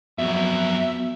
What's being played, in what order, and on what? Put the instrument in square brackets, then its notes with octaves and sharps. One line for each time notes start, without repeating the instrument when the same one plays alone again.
[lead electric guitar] F2 F#3 [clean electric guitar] B2 [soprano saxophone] E5